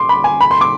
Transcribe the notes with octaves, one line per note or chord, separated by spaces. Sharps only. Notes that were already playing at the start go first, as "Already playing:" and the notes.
Already playing: C6 D6
B5
G#5
B5
C6
D6